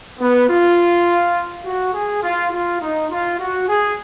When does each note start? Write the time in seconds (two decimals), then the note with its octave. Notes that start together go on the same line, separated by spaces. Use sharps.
0.20 B3
0.49 F4
1.65 F#4
1.94 G#4
2.23 F4
2.52 F4
2.81 D#4
3.10 F4
3.40 F#4
3.68 G#4